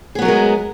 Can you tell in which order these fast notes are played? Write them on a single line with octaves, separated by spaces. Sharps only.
G#4 B3 F#3 A#4 G#3